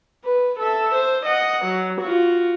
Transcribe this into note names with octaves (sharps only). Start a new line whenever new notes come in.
B4
A4 E5
C5
D#5 F#5
F#3
F4 F#4